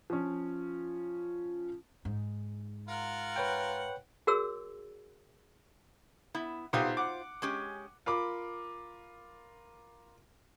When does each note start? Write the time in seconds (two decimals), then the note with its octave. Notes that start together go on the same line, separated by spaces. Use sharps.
0.10 F3 C#4
2.05 G#2
2.88 F4 A#4 F#5
3.36 B4 C#5 G5
4.27 F#4 G#4 A#4 C#5 E6
6.35 B3 E4
6.73 B1 F4 G4 C5 F5 D#6
6.97 F#5 D6
7.42 G#3 C#4 G4
8.06 F4 A#4 B5 D6